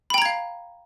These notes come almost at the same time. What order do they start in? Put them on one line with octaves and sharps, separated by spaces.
B5 G5 A#5 G#6 F5